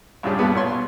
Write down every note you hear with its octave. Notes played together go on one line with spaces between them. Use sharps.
A#1 G2 A#2 C#3 G3 D4
B1 G2 A#2 G3 B3
B1 A#2 B4 C#5 C6
B2